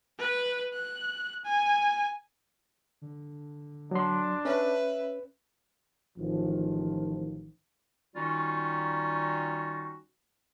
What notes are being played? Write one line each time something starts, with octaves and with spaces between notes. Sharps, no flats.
B4
F#6
G#5
D3
F#3 D4 C6
C#4 B4 E5
A1 D#3 F3
D#3 G3 C#4 D#4 F4 F#4